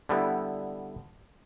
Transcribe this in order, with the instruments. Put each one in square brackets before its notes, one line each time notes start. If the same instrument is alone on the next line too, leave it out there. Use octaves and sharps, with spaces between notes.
[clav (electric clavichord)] D3 G3 B3 E4